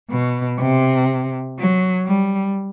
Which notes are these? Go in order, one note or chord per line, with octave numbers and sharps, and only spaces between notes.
B2
C3
F#3
G3